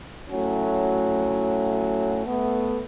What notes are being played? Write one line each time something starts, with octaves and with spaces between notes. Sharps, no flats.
A2 F#3 A3 C#4 F#4
A3 B3